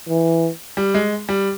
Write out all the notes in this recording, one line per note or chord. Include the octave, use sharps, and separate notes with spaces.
E3
G3
G#3
G3